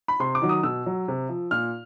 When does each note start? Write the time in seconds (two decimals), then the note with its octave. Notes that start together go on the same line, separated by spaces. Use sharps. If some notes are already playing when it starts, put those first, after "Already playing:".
0.08 B5
0.20 C3 C6
0.35 D6
0.41 D#3 F#3
0.49 D#6
0.63 B2 E6
0.86 F#3
1.08 C3
1.29 F3
1.51 A#2 F6